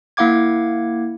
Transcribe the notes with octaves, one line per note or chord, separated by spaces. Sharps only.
A#3 E4 F5 F#5 D6 G#6